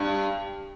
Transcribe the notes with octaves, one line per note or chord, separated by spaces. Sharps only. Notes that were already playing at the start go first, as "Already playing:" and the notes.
Already playing: G2